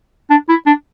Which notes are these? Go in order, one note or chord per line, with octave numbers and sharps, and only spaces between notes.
D4
E4
D4